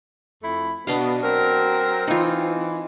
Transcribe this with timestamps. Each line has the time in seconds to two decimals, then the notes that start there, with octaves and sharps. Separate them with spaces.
0.42 F2 A3 E4
0.87 B2 B3 D4 D#5 F5
1.23 F#3 C4 A#4
2.08 E3 D#4 F4